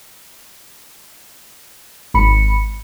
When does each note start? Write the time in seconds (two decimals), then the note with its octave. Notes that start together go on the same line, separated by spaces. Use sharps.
2.14 G#1 B5 C#7